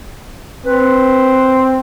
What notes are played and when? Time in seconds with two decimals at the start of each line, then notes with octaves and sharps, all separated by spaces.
0.66 C4 B4